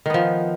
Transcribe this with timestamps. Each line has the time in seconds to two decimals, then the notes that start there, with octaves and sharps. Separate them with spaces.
0.06 D#3
0.10 B3
0.14 F3